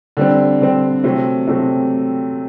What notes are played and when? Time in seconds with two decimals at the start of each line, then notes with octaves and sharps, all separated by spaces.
0.17 D3 G3 C4
0.61 D3 G3 C4
1.04 C3 F#3 A3 C4
1.47 C3 F#3 A3 C4